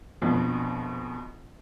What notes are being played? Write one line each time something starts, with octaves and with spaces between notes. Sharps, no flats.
A#1 F2 B2